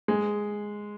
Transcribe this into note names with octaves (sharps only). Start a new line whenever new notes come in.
G#3